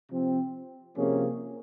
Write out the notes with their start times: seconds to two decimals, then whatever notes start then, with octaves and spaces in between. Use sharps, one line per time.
0.10 C3 F3 C4
0.97 C3 F3 A#3 C#4 G#4